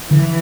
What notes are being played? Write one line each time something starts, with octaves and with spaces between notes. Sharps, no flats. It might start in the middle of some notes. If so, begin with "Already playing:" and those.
D3 E3